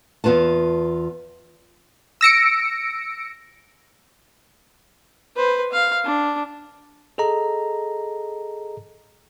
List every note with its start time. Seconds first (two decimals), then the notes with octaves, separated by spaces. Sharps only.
0.24 E2 B3 F4 B4 A5
2.21 E6 A#6 C#7 D7
5.36 B4 C5
5.72 F5
6.04 D4
7.18 G#4 A4 D#5 A#5